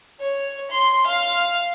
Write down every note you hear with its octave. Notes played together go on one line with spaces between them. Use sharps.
C#5
C6
F5